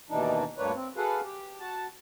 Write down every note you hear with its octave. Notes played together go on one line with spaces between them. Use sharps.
D#2 B2 E3 D4 D#4
D2 G2 A#3 D4 B4 C#5
C4
F#4 G#4 A4 B4 F5 F#5
G4
F#4 A5